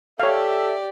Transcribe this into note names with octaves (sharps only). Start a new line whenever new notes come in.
G4 A4 C#5 D5 E5 F5